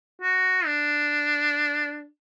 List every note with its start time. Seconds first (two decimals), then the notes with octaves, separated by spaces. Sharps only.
0.21 F#4
0.66 D4